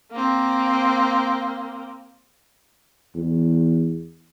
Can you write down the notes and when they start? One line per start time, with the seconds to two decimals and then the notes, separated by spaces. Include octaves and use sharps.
0.11 A#3 C4
3.16 E2